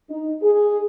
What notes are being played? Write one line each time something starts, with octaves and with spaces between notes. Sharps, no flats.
D#4
G#4